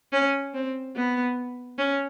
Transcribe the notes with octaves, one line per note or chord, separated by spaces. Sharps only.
C#4
C4
B3
C#4